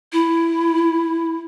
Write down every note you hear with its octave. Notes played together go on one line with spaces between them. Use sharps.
E4